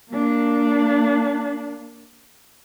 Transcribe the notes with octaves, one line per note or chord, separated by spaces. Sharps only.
A#3 D4